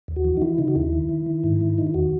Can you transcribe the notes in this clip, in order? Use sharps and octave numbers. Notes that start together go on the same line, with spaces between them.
D#2
F#4
E3
D#4
E3 E4
C#3 D#4
F#4
D#2 E4
D#3
D#3
D#3
G#2
D#3
D#3 D#4
E4
E2 F#4